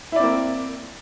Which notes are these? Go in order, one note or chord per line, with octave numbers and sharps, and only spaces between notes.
A#3 C4 E4 D5